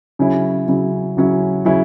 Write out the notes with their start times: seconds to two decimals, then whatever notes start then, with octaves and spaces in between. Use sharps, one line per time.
0.19 C#3 F#3 C#4 E4
0.68 C#3 F#3 C#4 E4
1.17 C#3 F#3 C#4 E4
1.65 C#3 F#3 C#4 E4